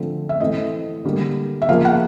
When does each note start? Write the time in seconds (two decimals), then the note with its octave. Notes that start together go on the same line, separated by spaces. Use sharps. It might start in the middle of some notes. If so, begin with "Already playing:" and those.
Already playing: D3 F3 A3 C4
0.29 E5
0.40 E3 A3 C4 D#5
1.04 D3 G3 A#3
1.62 E5
1.69 C#3 F3 A#3 F5
1.85 F#5